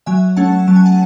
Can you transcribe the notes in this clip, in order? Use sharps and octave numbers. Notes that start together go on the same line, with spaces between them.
F#3 E5 G#5
A3 C#4 F#5 A5
F#3 A5
G#5
F#5 A5